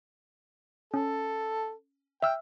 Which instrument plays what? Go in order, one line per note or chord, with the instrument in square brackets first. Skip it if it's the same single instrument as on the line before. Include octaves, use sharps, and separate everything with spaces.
[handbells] C#4 [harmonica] A4
[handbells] E5 E6 F6 [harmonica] G5